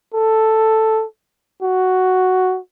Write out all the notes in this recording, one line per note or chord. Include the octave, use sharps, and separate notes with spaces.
A4
F#4